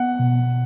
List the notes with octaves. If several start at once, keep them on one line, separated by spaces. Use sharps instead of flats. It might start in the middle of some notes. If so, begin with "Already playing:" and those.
Already playing: B3 F#5
B2